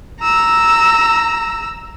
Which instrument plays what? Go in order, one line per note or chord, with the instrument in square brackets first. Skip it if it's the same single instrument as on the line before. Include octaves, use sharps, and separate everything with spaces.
[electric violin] A#5 E6